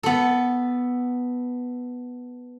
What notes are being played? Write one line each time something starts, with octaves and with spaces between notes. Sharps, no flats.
B3 A4